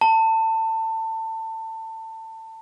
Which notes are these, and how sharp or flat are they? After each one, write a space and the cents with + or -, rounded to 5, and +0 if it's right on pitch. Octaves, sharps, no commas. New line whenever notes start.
A5 +25